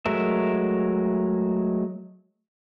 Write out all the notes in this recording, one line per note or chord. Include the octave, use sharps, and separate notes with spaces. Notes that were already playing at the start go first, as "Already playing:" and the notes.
F#3 G#3 A3 A#4 E5